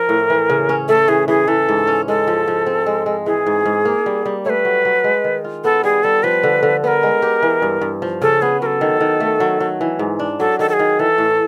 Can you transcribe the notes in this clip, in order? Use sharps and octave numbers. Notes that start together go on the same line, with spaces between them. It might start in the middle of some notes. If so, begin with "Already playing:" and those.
Already playing: F3 A#4
A2
E3
C#3
C#4
A3 A4
E3 G#4
E3 G#4
E3 A4
G#2
C#4
G#3 A4
F3
F3
C4
G#3
G#3
E3 G#4
G#2
G#2
A#3
G3
G3
A3 B4 C#5
F#3
F#3
G#3
D#3
F4
B3 A4
G3 G#4
G3 A4
F3 B4
D3
D3
B3 A#4 B4
G#3
G4
E3
G2
G2
F3
C#3 A4
B3 G#4
F#3 A4 A#4
D#3
D#3
A3
F#3
F#3
E3
G#2
D4
F#3 A4
D#3 A4
A4
G#4
D#3
E3 A4
A2